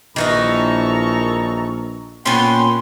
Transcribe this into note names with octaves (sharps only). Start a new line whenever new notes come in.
A#1 D#3 E3 D#4 A4 A#5 C#6
A#2 B3 C#4 F#5 G5 C6